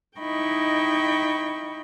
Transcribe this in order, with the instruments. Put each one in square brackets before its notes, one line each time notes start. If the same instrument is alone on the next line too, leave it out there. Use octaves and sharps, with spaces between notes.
[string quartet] D#4 E4 D#5 G5 B5 C#6